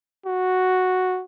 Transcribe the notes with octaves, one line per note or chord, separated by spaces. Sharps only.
F#4